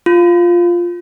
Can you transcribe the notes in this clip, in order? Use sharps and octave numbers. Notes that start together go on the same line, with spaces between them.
F4